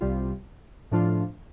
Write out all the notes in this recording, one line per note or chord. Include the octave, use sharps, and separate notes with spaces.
C2 C3 G3 F4
A2 F3 D4 F4